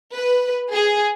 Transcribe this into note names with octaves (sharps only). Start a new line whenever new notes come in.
B4
G#4